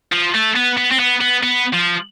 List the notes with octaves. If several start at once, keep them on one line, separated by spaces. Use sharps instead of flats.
F3
A3
B3
B3
C4
B3
B3
B3
F3